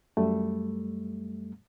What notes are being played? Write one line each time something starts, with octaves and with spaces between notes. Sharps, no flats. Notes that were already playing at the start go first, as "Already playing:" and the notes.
F#2 G3 A3